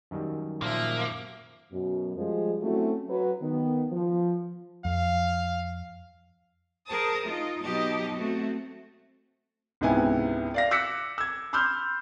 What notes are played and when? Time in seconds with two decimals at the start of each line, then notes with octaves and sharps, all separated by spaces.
0.11 F#2 D#3 G3
0.62 A#2 F3 A#3 E5
1.72 F#2 B2
2.18 F3 G3 G#3
2.62 F#3 A3 C4 C#4 E4 F#4
3.09 F#3 B4
3.42 D#3 B3
3.92 F3
4.85 F2 F5
6.87 G#4 A#4 C5 A5 D#6
7.25 D#4 F4 D#5
7.61 B2 F#3 D#4 G4 D#5 A5
8.13 A3 C4 F#4
9.81 C#2 G#2 C3 B3 E4 G#5
10.54 D5 F5 A#6
10.71 D6 E6 F#6 A#6 B6 C#7
11.18 E6 G#6
11.53 B5 C6 E6 F6 G6